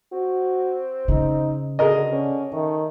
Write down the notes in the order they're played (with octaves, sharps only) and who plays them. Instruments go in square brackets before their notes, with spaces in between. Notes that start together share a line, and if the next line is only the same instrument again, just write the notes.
[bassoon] C4 [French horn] F#4
[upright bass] C#3 [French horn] D#4
[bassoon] B2 [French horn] D3 [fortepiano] G#4 A#4 D#5
[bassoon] D3 [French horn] C#4
[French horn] D#3 [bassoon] A3